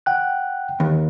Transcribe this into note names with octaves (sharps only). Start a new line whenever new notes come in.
F#5 G5 F#6
D#2